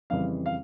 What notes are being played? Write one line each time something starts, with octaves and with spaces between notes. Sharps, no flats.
F2 C#3 E3 G3 F5
F5